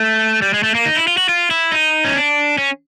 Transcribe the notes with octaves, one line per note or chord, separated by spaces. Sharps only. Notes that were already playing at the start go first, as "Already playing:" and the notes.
Already playing: A3
G3
G#3
A3
A#3
D#4
E4
F4
F#4
F4
E4
D#4
C#4
D4
C#4